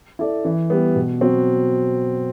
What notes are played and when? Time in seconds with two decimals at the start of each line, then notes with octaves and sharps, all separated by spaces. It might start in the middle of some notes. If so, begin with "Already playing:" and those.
0.19 E4 A4 D5
0.45 E3
0.70 G3 B3
0.96 B2
1.21 F#3 C4 F#4